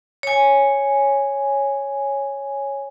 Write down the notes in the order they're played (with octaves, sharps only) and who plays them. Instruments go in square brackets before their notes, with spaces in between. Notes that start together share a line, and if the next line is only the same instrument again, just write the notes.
[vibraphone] C#5 G#5